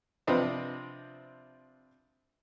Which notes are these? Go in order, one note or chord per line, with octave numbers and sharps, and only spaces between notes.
C3 F3 C4 D4 B4 D#5